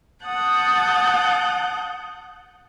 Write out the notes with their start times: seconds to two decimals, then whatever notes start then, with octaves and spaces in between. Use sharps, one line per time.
0.24 F#5 A5 D#6 F#6 G6